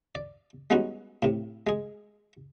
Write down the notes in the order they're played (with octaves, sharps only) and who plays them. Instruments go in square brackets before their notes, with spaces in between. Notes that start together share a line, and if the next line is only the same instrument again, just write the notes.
[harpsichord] D5
G3 G#3 B3 C#4 D#4 F#4
A2 C3
G#3 G#4